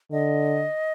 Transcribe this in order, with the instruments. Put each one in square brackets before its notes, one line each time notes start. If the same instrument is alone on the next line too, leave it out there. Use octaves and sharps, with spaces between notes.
[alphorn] D3 [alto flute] D#5